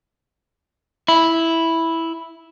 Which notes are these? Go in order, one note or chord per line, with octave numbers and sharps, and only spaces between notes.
E4